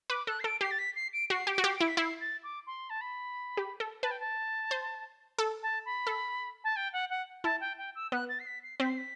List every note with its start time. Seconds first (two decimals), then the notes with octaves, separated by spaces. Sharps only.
0.10 B4 D6
0.27 A4 F#6
0.39 C7
0.44 A4 D7
0.61 G4 C7
0.70 A6
0.78 B6
0.95 C7
1.13 D7
1.30 F#4 C7
1.47 G4
1.52 D7
1.58 F#4
1.64 G4
1.68 C7
1.75 D7
1.81 E4
1.87 B6
1.97 E4 C7
2.20 A6
2.43 D6
2.66 C6
2.89 A5
3.01 B5
3.57 G4
3.80 A4
4.02 B4 A5
4.10 G5
4.19 A5
4.71 C5
5.38 A4
5.62 A5
5.85 B5
6.07 A4
6.63 A5
6.76 G5
6.92 F#5
7.09 F#5
7.44 E4 A5
7.60 G5
7.78 G5
7.95 E6
8.12 B3 F#6
8.29 A6
8.39 C7
8.46 B6
8.63 C7
8.80 C4 B6
8.89 C7
8.97 B6